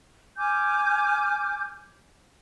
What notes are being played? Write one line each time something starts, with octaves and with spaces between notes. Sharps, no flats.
G#5 D6 F6 G6